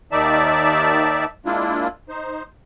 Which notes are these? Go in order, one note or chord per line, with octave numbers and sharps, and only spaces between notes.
D#2 D#3 D#4 D5 E5 A5
G#3 A#3 D4 E4 F4
D#4 C5